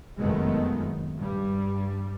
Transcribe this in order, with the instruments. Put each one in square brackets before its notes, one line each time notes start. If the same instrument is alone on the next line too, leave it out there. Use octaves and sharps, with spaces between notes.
[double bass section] F1 F#2 D#3 G#3 A3 B3
G2 G3